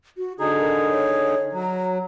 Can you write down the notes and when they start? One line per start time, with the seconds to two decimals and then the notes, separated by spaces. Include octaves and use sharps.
0.17 F#4
0.39 D3 D#4 G#4 A#5
0.59 A#4
0.90 C#5
1.53 F#3 A#5